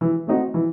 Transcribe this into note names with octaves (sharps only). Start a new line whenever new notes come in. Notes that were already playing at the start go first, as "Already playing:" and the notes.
E3
A3 C4 D#4 F#4
E3